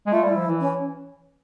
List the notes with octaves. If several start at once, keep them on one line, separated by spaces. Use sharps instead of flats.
G#3
A3 F4
G3
E4
F3
E3
C#4